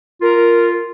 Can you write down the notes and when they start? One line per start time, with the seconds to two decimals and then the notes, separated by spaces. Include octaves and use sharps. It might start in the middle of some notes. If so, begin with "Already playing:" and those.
0.21 F4 A#4